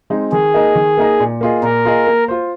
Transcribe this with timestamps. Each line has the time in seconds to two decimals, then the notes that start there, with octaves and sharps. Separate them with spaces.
0.10 G#3 C4 D#4
0.32 D#3 G#4
0.54 A#3 D#4 A#4 D#5
0.75 D#3
0.97 A#3 D#4 A#4 D#5
1.20 A#2
1.41 A#3 F4 G#4 D#5
1.62 A#2 A#4
1.85 A#3 F4 G#4 D#5
2.07 A#3
2.28 F4 C5